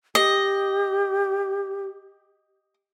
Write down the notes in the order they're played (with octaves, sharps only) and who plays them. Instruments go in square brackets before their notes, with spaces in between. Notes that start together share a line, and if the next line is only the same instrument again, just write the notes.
[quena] G4 [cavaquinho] D#5